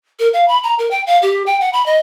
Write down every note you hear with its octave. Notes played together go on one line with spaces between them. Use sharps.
A#4
F5
B5
A#5
A#4
G5
F5
G4
G5
F#5
B5
D#5